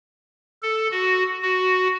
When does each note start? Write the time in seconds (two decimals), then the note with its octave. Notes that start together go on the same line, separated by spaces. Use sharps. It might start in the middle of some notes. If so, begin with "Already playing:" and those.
0.63 A4
0.91 F#4
1.43 F#4